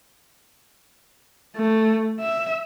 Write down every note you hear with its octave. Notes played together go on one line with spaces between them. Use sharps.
A3
E5